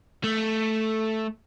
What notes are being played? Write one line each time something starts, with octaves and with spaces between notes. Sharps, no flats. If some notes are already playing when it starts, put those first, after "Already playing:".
A3